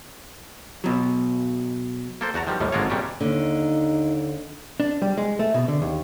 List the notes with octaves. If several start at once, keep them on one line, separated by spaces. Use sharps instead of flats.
B2 F#3
A#3 A4 C5
E2 F#4 A5 A#5
D#3 F3 G3
D#2 A2 D#3 G3
G#1 D3 G#3 A#3 F4 C#5
F2 A#2 G3 C#4 D4
D#2 D3 D#4
D4
G3
G#3
A3
B2
D3
D#2